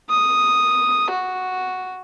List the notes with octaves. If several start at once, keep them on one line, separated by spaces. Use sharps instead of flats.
D#6
F#4